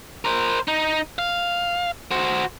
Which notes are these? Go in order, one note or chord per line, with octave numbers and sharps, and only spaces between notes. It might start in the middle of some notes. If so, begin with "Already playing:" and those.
A#4 C5
D#4
F5
F#4 C5